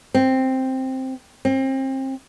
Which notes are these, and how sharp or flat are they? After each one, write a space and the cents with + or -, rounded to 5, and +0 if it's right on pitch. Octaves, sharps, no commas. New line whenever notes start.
C4 +5
C4 +30